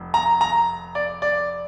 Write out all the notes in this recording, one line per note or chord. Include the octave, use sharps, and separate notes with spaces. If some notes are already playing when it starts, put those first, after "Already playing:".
Already playing: F1
A#5
A#5
D5
D5